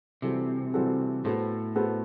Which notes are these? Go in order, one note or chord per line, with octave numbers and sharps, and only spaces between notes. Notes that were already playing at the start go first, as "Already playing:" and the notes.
C3 E3 G3 C4 F#4 A4
E3 G3 C4 F#4 A4
A2 B3 F#4 A4 C5
B3 F#4 A4 C5